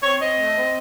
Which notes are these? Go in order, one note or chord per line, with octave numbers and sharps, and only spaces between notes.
C4 C#5
C4 D#5
A3
C4